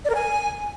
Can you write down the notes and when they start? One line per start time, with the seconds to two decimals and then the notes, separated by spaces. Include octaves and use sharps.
0.05 D5
0.10 A#4
0.15 G#5